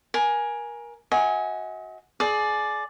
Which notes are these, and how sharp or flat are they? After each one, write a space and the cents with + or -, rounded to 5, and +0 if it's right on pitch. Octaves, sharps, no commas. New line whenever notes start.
A#4 +25 G#5 +0
F#4 +0 D#5 +45 G#5 +0
G#4 +30 D5 +5